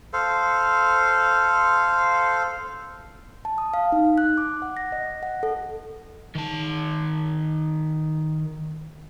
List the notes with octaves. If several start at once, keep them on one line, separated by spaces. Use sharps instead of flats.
A4 C5 F5
A5
D#6
F5
D#4
F#6
D6
F#5
A#6
D#5
F#5
A4
D#3 A5